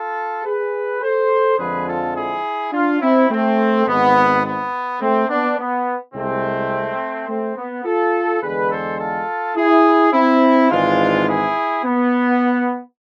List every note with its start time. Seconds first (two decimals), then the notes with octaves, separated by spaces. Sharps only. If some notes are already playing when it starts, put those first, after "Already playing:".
Already playing: F4 A4
0.45 G#4 B4
1.02 A4 C5
1.58 F2 D3 F3 G#3 G#4 B4
1.87 F4 A4
2.16 E4 G#4
2.72 D4 F4
3.01 C4 E4
3.30 A3 C4
3.87 G#1 G#2 G#3 B3
4.44 B3
5.01 A3 C4
5.29 B3 D4
5.58 B3
6.14 C2 C3 G#3 A3 C4
7.28 A3 C4
7.57 B3
7.85 F4 A4
8.42 E2 D3 G#3 G#4 B4
8.71 A4 C5
8.99 F4 A4
9.56 E4 G#4
10.13 C4 E4
10.70 G#1 G#2 E3 G#3 D4 F4
11.27 E4 G#4
11.84 B3